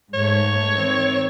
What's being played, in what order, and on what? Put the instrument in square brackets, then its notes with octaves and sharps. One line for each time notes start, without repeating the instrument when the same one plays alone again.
[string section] G#2 A3 [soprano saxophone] C#5
[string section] D#3 C4